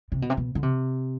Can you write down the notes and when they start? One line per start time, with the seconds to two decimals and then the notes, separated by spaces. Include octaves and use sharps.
0.12 C3
0.22 B2
0.30 C3
0.37 B2
0.55 D3
0.63 C3